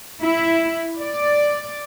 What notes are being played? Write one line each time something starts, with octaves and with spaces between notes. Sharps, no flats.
E4
D5